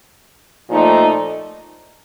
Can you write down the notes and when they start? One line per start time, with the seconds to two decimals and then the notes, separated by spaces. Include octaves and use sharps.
0.70 A#2 F3 A3 D#4